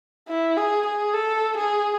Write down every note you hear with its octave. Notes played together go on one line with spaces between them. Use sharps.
E4
G#4
G#4
A4
G#4